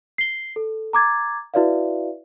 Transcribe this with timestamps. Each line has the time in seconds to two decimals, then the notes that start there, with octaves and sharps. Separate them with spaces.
0.18 C7 G7
0.56 A4
0.93 A#5 D6 G#6 A6
1.54 E4 F#4 B4 D5 E5 F5